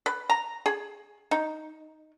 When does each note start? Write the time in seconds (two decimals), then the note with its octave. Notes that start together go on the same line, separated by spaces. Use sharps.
0.06 B4
0.30 A#5
0.66 G#4
1.31 D#4